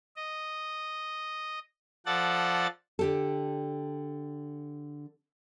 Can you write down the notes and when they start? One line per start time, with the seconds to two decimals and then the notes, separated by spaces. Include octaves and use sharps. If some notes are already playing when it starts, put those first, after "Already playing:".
0.16 D#5
2.06 F3 A4 D5 F#5 A6
2.99 D3 G4 A4